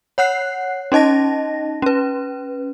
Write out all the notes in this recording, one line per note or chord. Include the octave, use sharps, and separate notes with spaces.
C#5 F#5 F#6 C7
C#4 D#4 D#5 A5 A#6
C#4 B4